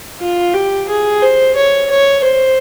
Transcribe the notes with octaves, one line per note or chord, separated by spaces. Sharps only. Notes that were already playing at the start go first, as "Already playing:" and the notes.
F4
G4
G#4
C5
C#5
C#5
C5